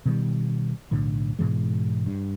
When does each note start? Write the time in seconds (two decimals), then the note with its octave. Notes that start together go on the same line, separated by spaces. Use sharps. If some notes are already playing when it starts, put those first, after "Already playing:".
0.06 B2 D#3 G3
0.91 B1 A2 D3
1.39 G#2 B2 E3 G#3
2.06 G2